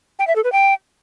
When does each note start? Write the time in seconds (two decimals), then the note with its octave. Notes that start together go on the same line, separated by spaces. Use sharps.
0.19 G5
0.27 E5
0.36 A4
0.44 B4
0.52 G5